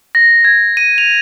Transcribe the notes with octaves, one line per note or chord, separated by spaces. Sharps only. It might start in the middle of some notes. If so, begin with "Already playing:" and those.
A#6
G#6
D#7
F7